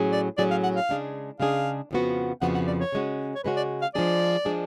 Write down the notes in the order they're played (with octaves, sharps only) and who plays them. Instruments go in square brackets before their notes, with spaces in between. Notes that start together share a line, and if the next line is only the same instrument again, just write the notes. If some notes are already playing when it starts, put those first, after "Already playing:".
Already playing: [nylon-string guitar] A2 F#3 C#4 G#4
[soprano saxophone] D5
[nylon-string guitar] A2 F#3 C#4 G#4 [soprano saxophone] D5
[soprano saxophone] F5
F#5
F5
[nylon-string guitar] C#3 G#3 D4 G#4
[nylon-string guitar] C#3 G#3 D4 G#4 [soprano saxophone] F5
[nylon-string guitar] F2 C#3 F3 B3 F#4
[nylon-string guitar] F2 C#3 F3 B3 F#4 [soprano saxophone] F#5
[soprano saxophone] F#5
D5
C#5
[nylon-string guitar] C#3 G#3 C#4 F#4
[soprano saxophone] C#5
[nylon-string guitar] C#3 G#3 C#4 F#4 [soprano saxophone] B4
[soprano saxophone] D5
F5
[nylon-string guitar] F3 G#3 D4 G#4 [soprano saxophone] D5
[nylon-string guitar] F3 G#3 D4 G#4